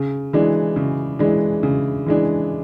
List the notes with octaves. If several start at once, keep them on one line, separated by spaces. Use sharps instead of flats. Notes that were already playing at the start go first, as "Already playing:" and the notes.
Already playing: C#3
E3 G#3 D4
C#3
E3 G#3 D4
C#3
E3 G#3 D4